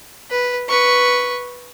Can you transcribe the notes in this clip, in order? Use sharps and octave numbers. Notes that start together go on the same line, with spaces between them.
B4
B4 C#6